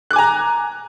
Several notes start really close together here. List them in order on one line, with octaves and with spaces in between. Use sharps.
F#6 D6 G#5 A#5